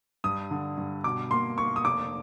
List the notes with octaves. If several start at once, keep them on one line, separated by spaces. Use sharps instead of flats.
G2 D#6
D3
G2
B2 D6
A#3 C6
A#3 C#6
D#6
F1 D6